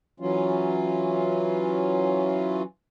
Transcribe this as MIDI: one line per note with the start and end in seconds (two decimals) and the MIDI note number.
0.20 2.62 52
0.20 2.62 54
0.20 2.62 61
0.20 2.62 65